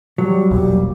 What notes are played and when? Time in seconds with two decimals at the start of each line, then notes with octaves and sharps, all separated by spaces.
0.18 F#3 G3
0.51 E1 A#1 G3